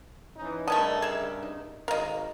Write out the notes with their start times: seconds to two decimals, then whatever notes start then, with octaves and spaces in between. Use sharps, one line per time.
0.36 E3 C#4 D#4
0.68 G2 C#3 A3 C#4 A#4 D5 D#5 A5
1.02 G#4 E5
1.43 D#4
1.88 G#1 A#4 D#5 F5